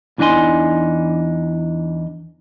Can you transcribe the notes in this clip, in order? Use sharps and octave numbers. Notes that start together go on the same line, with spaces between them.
E2 E3 D4 D#4 G#5 C6